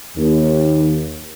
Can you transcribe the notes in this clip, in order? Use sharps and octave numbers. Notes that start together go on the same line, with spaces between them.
D#2